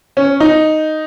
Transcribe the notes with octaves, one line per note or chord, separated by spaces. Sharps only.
C#4
D#4